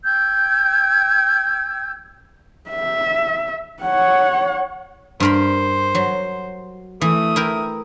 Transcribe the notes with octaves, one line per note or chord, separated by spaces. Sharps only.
G5 E6 G6 G#6
E5
C#5 F#5
G2 A#4 C5 B5
F#3
E3 A3 D#6
E4 A#4 G5